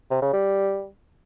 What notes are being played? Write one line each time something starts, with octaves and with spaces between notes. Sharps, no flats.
C3
C#3
G3